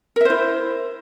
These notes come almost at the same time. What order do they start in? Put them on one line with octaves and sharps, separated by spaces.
A#4 E5 C5 E4